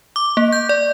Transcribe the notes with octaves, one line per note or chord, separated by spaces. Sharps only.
D6
A#3
G6
D5